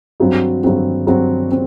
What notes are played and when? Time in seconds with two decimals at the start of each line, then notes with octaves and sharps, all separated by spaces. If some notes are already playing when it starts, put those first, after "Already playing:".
0.20 G2 F#3 C4 F#4
0.64 G2 F#3 C4 F#4
1.07 G2 F#3 C4 F#4
1.52 C4